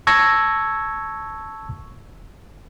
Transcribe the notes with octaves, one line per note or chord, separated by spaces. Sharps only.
A5 C#6 E6 G#6 A#6